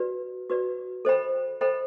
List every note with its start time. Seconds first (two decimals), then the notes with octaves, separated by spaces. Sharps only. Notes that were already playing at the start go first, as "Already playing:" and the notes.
Already playing: F#4 B4 D5
0.50 F#4 B4 D5
1.05 A4 C5 D#5 G5 B5
1.61 A4 C5 D#5 G5 B5